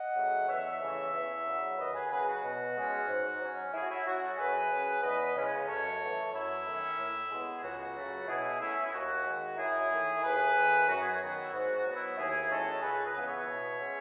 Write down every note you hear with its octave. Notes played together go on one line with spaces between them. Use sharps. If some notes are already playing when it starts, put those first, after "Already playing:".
Already playing: D#5 F#5
C#3 F#3 A3
E2 C#5 E5
C#3 E3 A3 C#4
E2
C#3 F#3
D#2 B4 D#5
G#4 B4
C#3 F#3 G#4 B4
F#4
B2
G#3 C#4
G#2
F#3 C#4
A2 E4 G#4
F#4
E4
F#3 C#4 F#4
F#4 A4
F#2 G#4 B4
C#3 F#3 C#4
E2 B4 D#5
C#3 G#3 C#4
F#2 A4 C#5
E3 A3
F#2 E4
D#3 A3 C#4
A2
G#3 B3
G#4
C#2 F#4
C#3 F#3 A3
B2 E4 G#4
A3 C#4 E4
E4
D#2 F#4
D#3 G#3
F#2 E4 G#4
D#3 A3
D#2 G#4 B4
D#3 A3
F#2 F#4
G#4
F#4
D#3 F#3 B3
E4
G#2 F#4
F#4
F#3
B3
E4
D#2 E4 G#4
D#3 G#3 C#4 F#4 A4
C#2 G#4 B4
B4 D#5
C#3 E3 B3
C#5 E5
B2
G#3 C#4